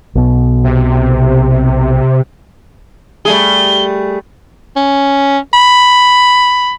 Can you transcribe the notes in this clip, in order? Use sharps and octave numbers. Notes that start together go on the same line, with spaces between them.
B1 B2
C3
G3 A3 G#4 G7
C#4
B5